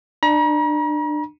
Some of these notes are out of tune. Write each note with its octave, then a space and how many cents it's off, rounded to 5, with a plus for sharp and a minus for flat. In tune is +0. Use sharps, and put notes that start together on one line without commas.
D4 +30 A#5 +40